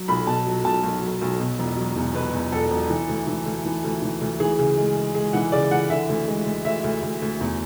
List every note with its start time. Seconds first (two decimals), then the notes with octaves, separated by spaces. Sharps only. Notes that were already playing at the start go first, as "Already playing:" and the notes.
Already playing: F#3
0.08 B1 B5
0.27 B2 A5
0.46 F#3
0.64 B1 A5
0.84 B1
1.02 F#3
1.21 B1
1.40 B2
1.59 E1
1.77 F#3
1.96 E2
2.14 B2 B4
2.33 E2
2.52 E1 A4
2.70 E1
2.90 E3
3.09 D2
3.27 E3
3.46 D2
3.65 E3
3.84 D2
4.02 E3
4.21 D2
4.40 E3 G#4
4.59 C#3
4.77 G#3
4.96 G#3
5.15 G#3 G#4
5.33 E3 F#5
5.52 C#3 D5
5.71 E3 F#5
5.90 D3 E5
6.09 D2
6.28 G#3
6.46 D2
6.65 D2 E5
6.84 D2
7.02 D2
7.21 D2
7.41 E2